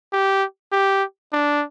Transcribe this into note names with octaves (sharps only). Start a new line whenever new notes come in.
G4
G4
D4